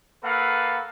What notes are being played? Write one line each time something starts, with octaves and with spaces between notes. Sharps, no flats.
A#3 A4 B4 F5 F#5